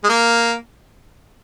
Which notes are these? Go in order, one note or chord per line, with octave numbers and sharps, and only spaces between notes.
G#3
A#3